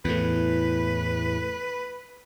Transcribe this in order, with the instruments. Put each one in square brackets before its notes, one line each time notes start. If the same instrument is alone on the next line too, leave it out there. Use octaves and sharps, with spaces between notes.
[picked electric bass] E2 A2 [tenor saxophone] B4